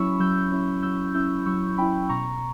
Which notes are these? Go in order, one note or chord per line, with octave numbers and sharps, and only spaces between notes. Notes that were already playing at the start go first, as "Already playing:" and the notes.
Already playing: F#3 C#4 E4 B5 C#6 E6
F#3 E6 G6
C#4 E4
F#3 E6 G6
C#4 E4 E6 G6
F#3 C#6 E6
C#4 E4 G5 B5
B2 A#5 C#6